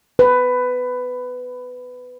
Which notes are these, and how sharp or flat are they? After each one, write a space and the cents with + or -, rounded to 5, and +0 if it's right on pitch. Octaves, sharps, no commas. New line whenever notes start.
B4 +15